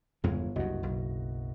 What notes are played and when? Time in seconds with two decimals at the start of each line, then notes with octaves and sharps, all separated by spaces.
0.24 G1 E2 C#3 G#3
0.56 F#1 C2 G2 F#4 D#5
0.83 B1